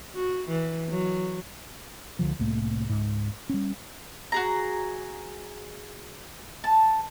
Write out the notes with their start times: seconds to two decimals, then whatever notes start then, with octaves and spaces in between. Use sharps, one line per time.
0.14 F#4
0.48 E3
0.89 F#3
2.19 C#2 D3 F3
2.39 C2 A2 A3 A#3
2.89 C#2 G#2
3.49 G3 C#4
4.32 F#4 G#4 A#5
6.64 A5